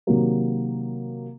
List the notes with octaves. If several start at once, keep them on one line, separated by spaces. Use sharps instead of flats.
C3 D#3 F#3 A#3